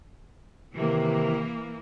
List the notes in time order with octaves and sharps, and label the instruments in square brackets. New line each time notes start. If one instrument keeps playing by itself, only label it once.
[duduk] C3 [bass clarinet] D#3 [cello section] E3 A#3